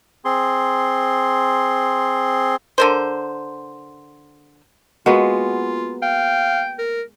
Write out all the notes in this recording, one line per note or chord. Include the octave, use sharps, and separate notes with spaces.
C4 G#4 C6
D3 A#4 C5
G#3 A#3 B3 F4 F#4
F5 G5
A#4